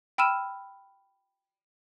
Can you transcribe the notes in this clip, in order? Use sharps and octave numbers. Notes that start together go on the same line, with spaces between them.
G5 B5 E6 F6 D#7 E7